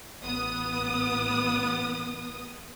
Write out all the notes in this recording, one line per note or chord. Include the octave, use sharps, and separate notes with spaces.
A1 B3 D#6